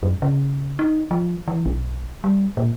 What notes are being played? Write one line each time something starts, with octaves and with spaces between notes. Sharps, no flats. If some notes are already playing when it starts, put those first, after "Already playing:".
F#2
C#3
D#4
F3
E3
B1
G3
A#2